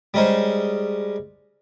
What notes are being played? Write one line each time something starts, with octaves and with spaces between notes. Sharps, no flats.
G3 G#3 C#4 D#4 C5